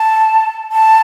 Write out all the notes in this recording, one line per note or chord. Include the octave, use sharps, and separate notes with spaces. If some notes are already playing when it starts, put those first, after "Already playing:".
Already playing: A5
A5